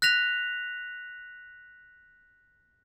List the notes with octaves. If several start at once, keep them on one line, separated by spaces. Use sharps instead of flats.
F#6 A#6 B6 F7